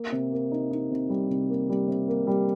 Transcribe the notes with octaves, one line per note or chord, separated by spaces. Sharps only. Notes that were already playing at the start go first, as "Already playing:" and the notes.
Already playing: A#3
C3
A#3
D#4
D#4
C3
G3
C3
A#3
G3
C3
A#3
G3